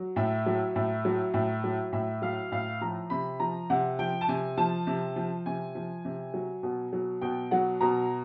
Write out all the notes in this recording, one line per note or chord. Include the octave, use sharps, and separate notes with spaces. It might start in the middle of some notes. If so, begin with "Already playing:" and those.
Already playing: F#3
A2 E5
F#3
A2
F#3
A2
F#3
A2 E5
F#3 F5
A2 F5
F3 A#5
C3 B5
F3 A#5
C3 F#5
F3 G5
A5
C3 G#5
F3 A5
C3
F3
C3 G#5
F3
C3
F#3
B2
F#3
B2 G5
F#3 F#5
B2 A#5